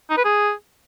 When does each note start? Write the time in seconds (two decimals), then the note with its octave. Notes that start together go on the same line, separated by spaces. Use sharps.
0.10 D#4
0.17 B4
0.25 G#4